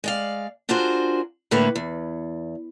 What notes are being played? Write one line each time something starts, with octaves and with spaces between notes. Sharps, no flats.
G#3 D5 F5
D4 F4 F#4 G#4 A#4 C5
D2 A2 D3 A#3 B4 C#5
E2